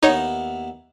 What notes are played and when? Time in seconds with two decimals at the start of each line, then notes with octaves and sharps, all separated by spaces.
0.03 D#2 B3 D#4 E4 C#5